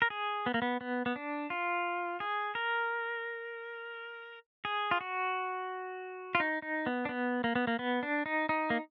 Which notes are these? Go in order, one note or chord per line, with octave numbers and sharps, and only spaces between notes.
A#4
G#4
B3
A#3
B3
B3
B3
D4
F4
G#4
A#4
G#4
F4
F#4
F4
D#4
D#4
B3
D4
B3
A#3
B3
A#3
B3
D4
D#4
D#4
A#3